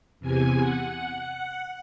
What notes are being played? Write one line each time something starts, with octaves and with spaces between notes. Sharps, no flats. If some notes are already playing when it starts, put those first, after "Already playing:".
E2 C3 G#5
F#5